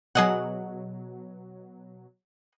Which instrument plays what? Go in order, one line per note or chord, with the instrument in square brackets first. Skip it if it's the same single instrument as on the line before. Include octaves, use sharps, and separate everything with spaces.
[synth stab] B2 F#3 [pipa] G#4 D#5 F#5